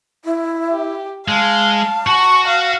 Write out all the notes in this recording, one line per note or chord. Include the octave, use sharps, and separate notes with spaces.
E4
G4
G#3 F5 A5
F#4 F#5 C#6
F5